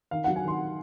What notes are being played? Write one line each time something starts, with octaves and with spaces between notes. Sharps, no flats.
D#3 F5
F#3 F#5
G#5
D#3 C6